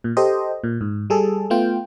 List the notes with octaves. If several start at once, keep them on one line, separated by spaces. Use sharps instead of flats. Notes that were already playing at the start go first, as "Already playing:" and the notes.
A#2
G4 A4 C5 D#5
A#2
G#2
G3 G#4 A4
A3 B3 F4 G5